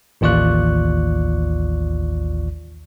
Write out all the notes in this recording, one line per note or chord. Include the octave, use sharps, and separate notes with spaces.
A1 D#2 F4 D5 C#6 F#6